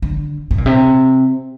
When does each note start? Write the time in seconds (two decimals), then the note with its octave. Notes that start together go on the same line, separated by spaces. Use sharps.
0.02 D3
0.51 C3
0.58 A#2
0.66 C3